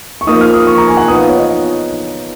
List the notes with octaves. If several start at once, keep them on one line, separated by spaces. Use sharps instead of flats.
C#6
F3 A#3 D#4 D#6
F6
D#6
C#6
A#5
G#5
F#5
F3 B3 D#4 D#6
F5
C#5
D#5